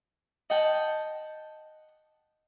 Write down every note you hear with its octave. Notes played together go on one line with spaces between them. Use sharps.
D#5 F#5 G5 A5